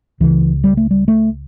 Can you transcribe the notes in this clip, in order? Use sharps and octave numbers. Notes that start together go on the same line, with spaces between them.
C#2 C#3 E3
G3
A3
G3
A3